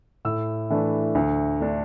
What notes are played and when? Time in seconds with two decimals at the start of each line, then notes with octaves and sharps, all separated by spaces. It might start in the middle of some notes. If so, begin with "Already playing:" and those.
0.25 A2 E6
0.70 E3 A3 D4
1.15 D2
1.60 D3 A3 D4